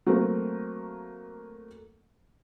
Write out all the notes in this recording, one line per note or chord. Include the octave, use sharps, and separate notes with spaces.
F#3 A3 A#3 C4 A#4